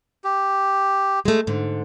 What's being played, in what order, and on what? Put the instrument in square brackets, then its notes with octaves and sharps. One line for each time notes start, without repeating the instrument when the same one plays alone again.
[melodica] G4
[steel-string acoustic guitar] G#3 A3
G#2 D3